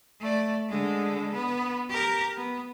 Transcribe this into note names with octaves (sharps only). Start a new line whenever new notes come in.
A3 D5
D3 G#3
B3
G4 A#4
B3